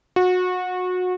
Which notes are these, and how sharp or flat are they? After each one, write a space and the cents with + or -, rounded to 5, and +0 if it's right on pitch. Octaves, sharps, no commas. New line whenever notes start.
F#4 -25